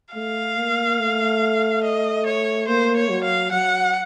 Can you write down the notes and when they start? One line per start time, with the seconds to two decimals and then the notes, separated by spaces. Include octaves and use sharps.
0.14 A3 F5
0.57 A#3
0.99 A3
1.84 D#5
2.26 C#5
2.68 A#3 C5
2.96 C#5
3.10 F#3
3.24 F5
3.52 F#3 F#5